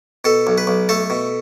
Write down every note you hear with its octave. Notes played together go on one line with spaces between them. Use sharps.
B2 A4
B1
B4
B1
A3 A4
B2